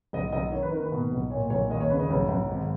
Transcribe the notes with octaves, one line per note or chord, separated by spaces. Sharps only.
B1 D#5
B1 D#5
D#3 C#5
B4
D#3 A#4
B4
B2
B1
A#2 C#5
B1 C#5
D#2 D#5
C#5
C#3 B4
D#5
B1 C#5
B1
G#1